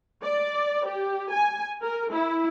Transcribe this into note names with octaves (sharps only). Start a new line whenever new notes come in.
D5
G4
G#5
A#4
E4